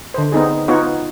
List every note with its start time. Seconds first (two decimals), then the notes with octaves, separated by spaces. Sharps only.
0.14 D3 C5
0.32 B3 C4 D#4 G#4
0.68 B3 D#4 F4 F#4 C#5